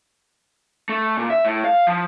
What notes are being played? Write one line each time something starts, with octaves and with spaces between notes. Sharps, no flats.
A3
A#2
E5
A2
F5
F3